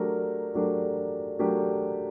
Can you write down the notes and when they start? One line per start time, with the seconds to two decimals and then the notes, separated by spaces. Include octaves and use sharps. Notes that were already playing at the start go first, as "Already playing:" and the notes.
Already playing: F#3 A3 D4 G4 A#4
0.55 F#3 A3 D4 G4 A#4
1.39 F#3 A3 D4 G4 A#4